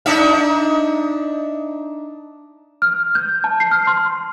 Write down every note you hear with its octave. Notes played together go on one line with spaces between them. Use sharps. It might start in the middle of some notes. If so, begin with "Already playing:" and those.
D4 D#4 E5
F6
G6
A5
C7
F6
C6